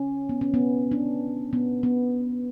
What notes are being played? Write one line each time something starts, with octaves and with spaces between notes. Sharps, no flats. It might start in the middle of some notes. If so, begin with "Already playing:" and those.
Already playing: C#4
B3
C#4
B3
D4
B3
B3